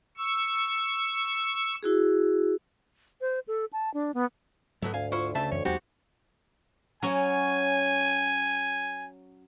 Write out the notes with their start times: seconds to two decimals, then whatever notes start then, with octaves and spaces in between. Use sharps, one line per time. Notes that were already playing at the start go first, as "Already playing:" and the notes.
0.17 C#6 E6
1.83 E4 F#4 G#4
3.21 C5
3.48 A4
3.73 A5
3.94 D4
4.14 B3
4.82 G#2 F#3 A3 B3
4.94 D2 F5 G#5
5.12 E4 F4 C5 C#6
5.35 C#3 A3 E5 A5
5.51 F#2 E3 C#5
5.65 E2 F#3 G#3 C4 D#4 F#4 G4
7.03 F#3 C#4 G#5